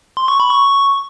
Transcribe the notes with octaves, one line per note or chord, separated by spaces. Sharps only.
C6
C#6
B5
C#6